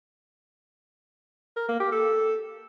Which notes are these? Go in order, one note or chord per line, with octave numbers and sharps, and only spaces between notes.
A#4
A#3
G4
A4